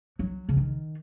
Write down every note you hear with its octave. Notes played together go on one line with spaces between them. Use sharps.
F#3
C#3
D#3